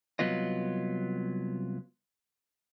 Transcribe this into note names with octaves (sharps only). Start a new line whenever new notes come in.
C2 D#3 F#3 B3 F4 D#5